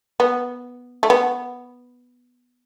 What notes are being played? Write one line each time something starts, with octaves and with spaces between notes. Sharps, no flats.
B3
A3
B3